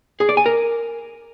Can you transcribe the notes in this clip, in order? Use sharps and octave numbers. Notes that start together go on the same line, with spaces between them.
G#4
D5
G#5
A#4